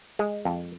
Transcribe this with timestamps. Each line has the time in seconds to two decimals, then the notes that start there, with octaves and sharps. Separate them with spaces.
0.19 G#3
0.45 F2